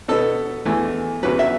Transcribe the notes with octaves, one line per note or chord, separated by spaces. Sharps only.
B2 B3 A4
E2 E3 A3
E2 C#3 F#3 B4
E5